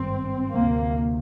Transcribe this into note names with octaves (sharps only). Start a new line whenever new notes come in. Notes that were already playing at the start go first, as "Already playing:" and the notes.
Already playing: G#1 G2 C4
D2 C3 A#3